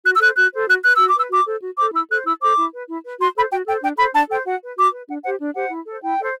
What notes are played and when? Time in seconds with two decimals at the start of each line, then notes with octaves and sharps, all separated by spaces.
0.04 F#4 F#6
0.14 E6
0.20 A4 C5 F#6
0.36 F#4 F#6
0.52 A4 C5
0.68 F#4 F#6
0.83 B4 F#6
0.94 F#4 E6
1.05 D6
1.15 B4 E6
1.30 F#4 D6
1.46 A4 C5
1.62 F#4
1.77 C5 D6
1.81 A4
1.93 E4 E6
2.09 A4 C5 F#6
2.25 E4 E6
2.41 A4 C5 D6
2.56 E4
2.71 B4
2.88 E4
3.03 B4
3.19 F#4 C6
3.35 A4 C5 B5
3.50 F#4 G5
3.66 A4 G5
3.70 C5
3.82 D4 G5
3.97 A4 C5 B5
4.13 D4 A5
4.29 A4 C5 G5
4.45 F#4 F#5
4.61 B4
4.76 F#4 D6
4.92 B4
5.07 D4 F#5
5.23 C5 F#5
5.26 G4
5.39 D4
5.55 G4 C5 F#5
5.70 E4
5.86 A4 C5
6.02 E4 G5
6.18 A4 C5